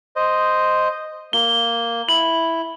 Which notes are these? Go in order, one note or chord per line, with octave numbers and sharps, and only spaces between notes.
C5 D#5
A#3 G7
E4 F#7